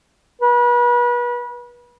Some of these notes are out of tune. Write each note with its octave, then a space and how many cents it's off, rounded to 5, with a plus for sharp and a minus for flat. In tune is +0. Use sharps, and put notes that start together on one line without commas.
B4 -35